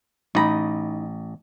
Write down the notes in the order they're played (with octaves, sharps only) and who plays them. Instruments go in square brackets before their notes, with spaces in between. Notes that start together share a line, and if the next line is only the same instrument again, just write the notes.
[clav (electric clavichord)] A1 A#5 [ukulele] D#4 B5